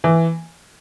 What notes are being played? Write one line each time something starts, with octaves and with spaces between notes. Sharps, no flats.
E3